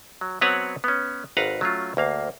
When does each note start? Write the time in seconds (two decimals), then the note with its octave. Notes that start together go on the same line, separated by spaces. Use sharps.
0.21 F#3
0.41 F#3 B3 C4 B4 C#5 F#5
0.84 B3 C#4
1.37 G#1 B4 F5 F#5 A#5
1.61 F#3 A3 C#4 F4
1.97 D2 A#3 F5